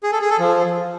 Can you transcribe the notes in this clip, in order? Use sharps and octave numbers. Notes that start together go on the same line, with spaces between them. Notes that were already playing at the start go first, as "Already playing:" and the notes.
G#4
A4
G#4
A4
F3